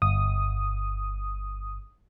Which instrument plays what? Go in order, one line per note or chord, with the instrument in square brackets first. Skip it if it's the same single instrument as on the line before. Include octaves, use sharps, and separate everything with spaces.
[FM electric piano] G1 D#6